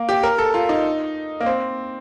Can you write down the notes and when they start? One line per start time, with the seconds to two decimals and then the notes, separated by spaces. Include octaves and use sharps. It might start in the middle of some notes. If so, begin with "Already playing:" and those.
Already playing: A#3
0.09 G4
0.23 A#4
0.38 A4
0.54 F4
0.69 D#4
1.41 A#3
1.46 C4